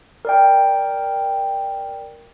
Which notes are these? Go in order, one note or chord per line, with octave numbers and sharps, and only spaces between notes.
A#4 D5 G5